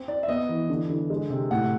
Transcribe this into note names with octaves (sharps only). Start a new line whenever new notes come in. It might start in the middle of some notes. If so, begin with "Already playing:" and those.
Already playing: C4
D#4 D5
E5
B3 D#5
E3
D3
D3
G#3
C3
A2 F#5